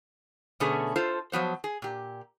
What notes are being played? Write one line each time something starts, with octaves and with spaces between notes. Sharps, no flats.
B2 D3 A3 B3 C#4 G#4
F4 A4 C5
F3 F#3 B3 C5
G#4
A#2 G4